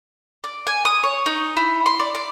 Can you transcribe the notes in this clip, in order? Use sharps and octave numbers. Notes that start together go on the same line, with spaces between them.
D5
G#5
D#6
C#5
D#4
E4
C6
D5
D5